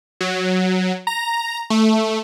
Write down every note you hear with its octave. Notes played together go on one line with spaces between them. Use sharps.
F#3
A#5
A3